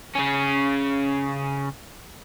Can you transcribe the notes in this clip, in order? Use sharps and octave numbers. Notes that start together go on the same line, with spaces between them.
C#3 C#4